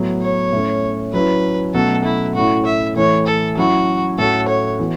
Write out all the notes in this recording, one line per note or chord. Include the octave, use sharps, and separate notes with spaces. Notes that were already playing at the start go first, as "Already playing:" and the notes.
Already playing: A2 F#3 B3
C#5
A2 A3 C#4
F#3 C#4 E4 B4
B2 F#3 A3 C#4 F#4 A4
E4
A2 A3 C#4 E4 F#4
E5
A2 E3 A3 C#5
A4
F#3 C#4 E4 F#4
A2 A3 C#4 F#4 A4
C#5
E3 B3 F#4